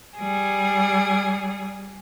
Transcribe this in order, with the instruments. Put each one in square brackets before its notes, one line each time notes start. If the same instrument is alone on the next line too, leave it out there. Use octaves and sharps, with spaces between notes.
[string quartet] G3 G#4